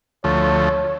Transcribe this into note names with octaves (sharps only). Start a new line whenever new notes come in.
D2 F3 A3 C#5